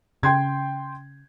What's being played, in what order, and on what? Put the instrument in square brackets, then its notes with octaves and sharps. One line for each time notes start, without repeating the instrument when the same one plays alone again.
[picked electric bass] C#3 [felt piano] G5 C6 G#6